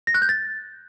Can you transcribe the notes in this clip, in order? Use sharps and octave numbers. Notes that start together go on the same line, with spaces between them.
A#6
F#6
G6
A6